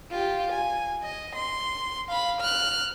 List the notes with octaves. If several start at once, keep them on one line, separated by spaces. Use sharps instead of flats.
F4 G4
G#5
D#5
C6
F5 B5
F6 F#6